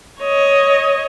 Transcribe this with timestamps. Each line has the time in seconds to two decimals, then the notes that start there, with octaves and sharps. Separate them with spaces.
0.21 C#5 D#5